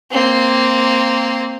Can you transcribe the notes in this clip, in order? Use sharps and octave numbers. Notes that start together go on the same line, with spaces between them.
A#3 C4